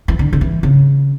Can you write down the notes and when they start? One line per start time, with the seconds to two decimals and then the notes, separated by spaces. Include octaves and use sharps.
0.08 E3
0.19 D3
0.33 D3
0.41 E3
0.63 C#3